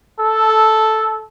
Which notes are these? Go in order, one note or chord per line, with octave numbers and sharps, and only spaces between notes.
A4